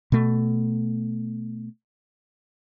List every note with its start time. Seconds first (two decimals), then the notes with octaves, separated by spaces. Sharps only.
0.12 B2 A3